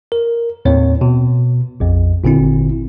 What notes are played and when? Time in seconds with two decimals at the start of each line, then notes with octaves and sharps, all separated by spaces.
0.12 A#4
0.65 D#2 A2 C4 C#5
1.01 B2
1.80 A#1 F2
2.24 G#1 A#2 D3 C4 E4